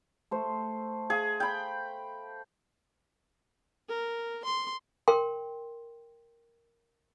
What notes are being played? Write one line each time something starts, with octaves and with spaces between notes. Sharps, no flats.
A3 C5
G#4 F5
G5 B5
A#4
C6
A#4 G5 C6